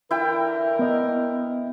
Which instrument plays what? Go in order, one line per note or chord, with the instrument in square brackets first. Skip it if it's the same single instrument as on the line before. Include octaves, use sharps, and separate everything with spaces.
[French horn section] D3 E3 A#4 [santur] E4 G5
[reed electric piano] B3 D#5